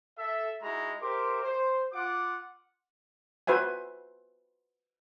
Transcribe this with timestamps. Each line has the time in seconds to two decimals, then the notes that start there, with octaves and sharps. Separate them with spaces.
0.18 A4 E5
0.62 G#3 D#4 E4 F#4 A#5
1.01 G4 A#4 C5 E5 C6 D6
1.44 C5
1.93 F4 F#5 D6
3.47 F#4 B4 C5 E5 G#5